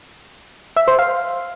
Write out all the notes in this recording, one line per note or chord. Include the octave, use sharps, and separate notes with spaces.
E5
C5
F5